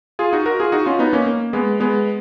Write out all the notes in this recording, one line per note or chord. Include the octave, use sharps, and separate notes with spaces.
F4 G#4
D#4 F#4
F#4 A#4
F4 G#4
D#4 F#4
C#4 F4
B3 D#4
A#3 C#4
A#3
G#3 B3
G#3 B3